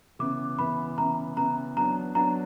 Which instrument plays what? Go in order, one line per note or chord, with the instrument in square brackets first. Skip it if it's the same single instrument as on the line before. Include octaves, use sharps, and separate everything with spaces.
[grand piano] C#3 E3 B3 [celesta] D6
[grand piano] C#3 E3 B3 [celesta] B5
[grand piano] C#3 E3 B3 [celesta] A#5
[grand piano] C#3 E3 B3 [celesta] A#5
[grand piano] F#3 B3 D4 [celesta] A#5
[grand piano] F#3 B3 D4 [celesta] A#5